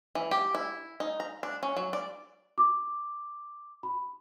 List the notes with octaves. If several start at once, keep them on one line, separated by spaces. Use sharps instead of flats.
E3
G4
E4
D#4
A#5
D4
C#4
F#3
D5
D6
B5